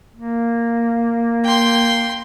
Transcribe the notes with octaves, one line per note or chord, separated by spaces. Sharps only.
A#3
G5 C6